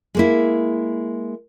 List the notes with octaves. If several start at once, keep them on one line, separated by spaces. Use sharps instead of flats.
G#3 A#3 E4